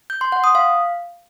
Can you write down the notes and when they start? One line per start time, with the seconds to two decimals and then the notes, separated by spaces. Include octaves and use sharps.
0.10 G6
0.21 C6
0.32 F#5
0.44 D#6
0.55 F5